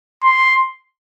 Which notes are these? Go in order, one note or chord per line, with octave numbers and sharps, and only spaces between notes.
C6